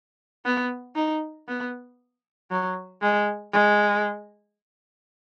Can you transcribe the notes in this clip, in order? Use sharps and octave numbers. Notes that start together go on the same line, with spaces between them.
B3
D#4
B3
F#3
G#3
G#3